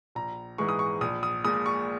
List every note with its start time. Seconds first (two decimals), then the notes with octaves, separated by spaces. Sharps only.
0.15 A#1 A#5
0.58 G#2 E3 G#3 C#6
0.69 D#6
0.79 C#6
1.01 A#1 D#6
1.23 D#6
1.44 A#2 G#3 D#6
1.66 C#6